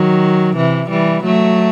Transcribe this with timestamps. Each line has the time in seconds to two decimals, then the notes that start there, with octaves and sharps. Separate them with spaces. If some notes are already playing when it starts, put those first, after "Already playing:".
Already playing: D#3 F#3
0.57 C3 E3
0.90 E3 G3
1.24 F#3 A3